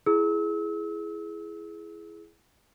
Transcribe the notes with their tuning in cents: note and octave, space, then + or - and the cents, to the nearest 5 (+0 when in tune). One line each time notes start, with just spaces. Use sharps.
E4 +15 G#4 +15 E6 -35